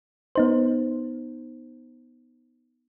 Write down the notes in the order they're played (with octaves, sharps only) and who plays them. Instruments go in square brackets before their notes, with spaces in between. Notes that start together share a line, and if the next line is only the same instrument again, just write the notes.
[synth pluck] B3 D#4 C5